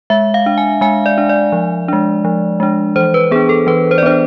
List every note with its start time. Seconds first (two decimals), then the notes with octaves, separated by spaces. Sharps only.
0.10 G#3 E5
0.34 F5
0.46 D4
0.58 G#5
0.81 G#3 G#5
1.06 D5
1.18 D4
1.29 D5
1.53 F3
1.88 G#3 D4
2.25 F3
2.60 G#3 D4
2.96 E3 C5
3.14 B4
3.31 B3 D4 G#4
3.49 A4
3.67 E3 B4
3.91 C5
3.98 D5
4.03 B3 D4 C5